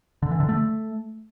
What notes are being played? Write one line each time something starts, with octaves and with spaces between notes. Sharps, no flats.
D3
E3
D3
A3